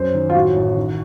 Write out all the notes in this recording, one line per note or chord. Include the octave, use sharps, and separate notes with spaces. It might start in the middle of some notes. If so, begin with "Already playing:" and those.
Already playing: F#2 C5
D#3
F4
A2 F#4
A1
D#3